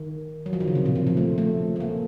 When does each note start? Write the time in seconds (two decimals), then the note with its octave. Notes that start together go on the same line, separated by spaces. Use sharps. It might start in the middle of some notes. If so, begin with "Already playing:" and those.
Already playing: D#3
0.46 F#3
0.53 F3
0.60 D#3
0.68 C#3
0.75 C3
0.86 A#2
0.96 C3
1.07 F3
1.17 A3
1.38 A3
1.76 A3
1.80 A#3